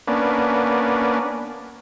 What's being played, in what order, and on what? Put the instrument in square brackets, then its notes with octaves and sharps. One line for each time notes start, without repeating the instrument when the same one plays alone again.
[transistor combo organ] A#3 B3 C#4 D4